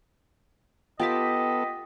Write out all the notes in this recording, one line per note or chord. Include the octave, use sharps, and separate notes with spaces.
B3 F4 G4 A4 D#5 G5 A5 B6